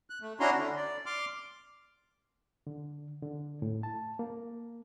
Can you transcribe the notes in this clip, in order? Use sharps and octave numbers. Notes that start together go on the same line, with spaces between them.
F#6
A3
C#4 D4 E4 F#4 A#5 C6
D3
D5
C6 D6 F6
D3
D3
A2
A5
A#3